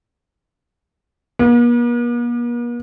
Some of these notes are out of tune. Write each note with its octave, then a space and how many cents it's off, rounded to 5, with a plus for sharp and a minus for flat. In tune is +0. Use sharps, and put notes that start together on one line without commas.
A#3 +45